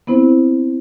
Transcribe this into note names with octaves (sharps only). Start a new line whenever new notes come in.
B3 C4 E4 C5